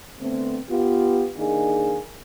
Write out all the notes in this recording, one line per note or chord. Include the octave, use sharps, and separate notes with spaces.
D3 A3 B3 C4
B3 F4 G4
D#3 A#3 D4 D#4 G#4